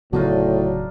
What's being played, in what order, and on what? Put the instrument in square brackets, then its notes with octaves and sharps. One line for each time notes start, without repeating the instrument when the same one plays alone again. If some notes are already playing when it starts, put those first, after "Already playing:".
[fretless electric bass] D1 C#3 B3 [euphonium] A2 [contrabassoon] F#3 [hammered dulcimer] D4 D#4 F4